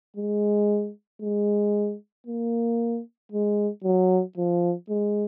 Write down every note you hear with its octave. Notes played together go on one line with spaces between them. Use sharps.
G#3
G#3
A#3
G#3
F#3
F3
G#3